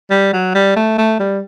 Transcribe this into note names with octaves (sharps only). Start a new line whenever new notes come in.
G3
F#3
G3
A3
A3
G3